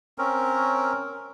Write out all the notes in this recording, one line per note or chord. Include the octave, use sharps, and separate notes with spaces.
C4 C#4 A#4